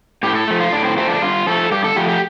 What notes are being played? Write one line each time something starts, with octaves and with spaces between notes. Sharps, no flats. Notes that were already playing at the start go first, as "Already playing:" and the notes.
A2 G4
A4
F3 A3
F4
A2 D4
C4
F3 A3 C4
D4
G2 F4
F3 A3 A4
G2 G4
A4
F3 A3 G4
G4